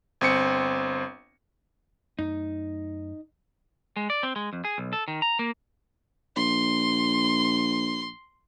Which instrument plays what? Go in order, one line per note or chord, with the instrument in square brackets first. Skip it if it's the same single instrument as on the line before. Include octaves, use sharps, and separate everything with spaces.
[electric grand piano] G1 C4 C#7
[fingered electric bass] F#2 A3 [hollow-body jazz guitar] D#4
[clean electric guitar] G#3
D5
C4
G#3
F2
G#4
B1
A4
D#3
A#5
A#3
[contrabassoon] A#1 [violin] C6